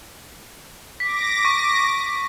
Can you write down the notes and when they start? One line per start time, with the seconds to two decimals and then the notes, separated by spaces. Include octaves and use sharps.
1.00 D6 A#6 B6
1.45 C#6